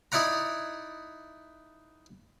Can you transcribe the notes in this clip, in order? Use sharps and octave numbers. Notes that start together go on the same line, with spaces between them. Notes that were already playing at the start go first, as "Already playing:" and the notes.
D#4 E4 D5 F#5 A#5